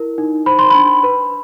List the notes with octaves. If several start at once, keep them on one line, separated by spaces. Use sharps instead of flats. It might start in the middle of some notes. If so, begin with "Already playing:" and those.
Already playing: E4 A#4
D#4
C5 B5
C6
D4 B5
B4